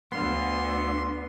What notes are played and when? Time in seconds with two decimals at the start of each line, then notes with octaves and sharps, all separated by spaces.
0.12 D2 D3 B3 F5 C6